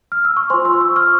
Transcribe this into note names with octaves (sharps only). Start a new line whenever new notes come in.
F6
E6
C#6
F4 C5 G#5 C6
C6 E6
C#6
C6 E6
C#6 F6